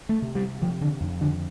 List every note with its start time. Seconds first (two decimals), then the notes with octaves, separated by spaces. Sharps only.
0.09 A3
0.22 C3
0.35 G3
0.62 C3 F3
0.81 D3
1.01 F2
1.21 D3